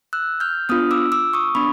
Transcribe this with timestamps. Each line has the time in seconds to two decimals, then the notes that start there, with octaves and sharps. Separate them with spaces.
0.13 E6 F#6
0.40 F6 G6
0.69 B3 D4 F4 D#6 F6
0.91 D6 E6
1.12 D6 E6
1.33 C#6 D#6
1.55 B3 D4 B5 C#6